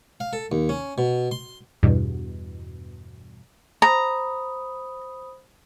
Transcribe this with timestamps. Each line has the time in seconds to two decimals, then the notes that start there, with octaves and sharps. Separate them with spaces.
0.20 F5
0.33 A4
0.52 D#2
0.69 C#4
0.98 B2
1.31 C6
1.83 E2 G2 B2
3.82 C5 A#5 B5 D#6